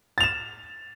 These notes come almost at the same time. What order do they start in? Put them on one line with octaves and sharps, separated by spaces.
A6 F7 E7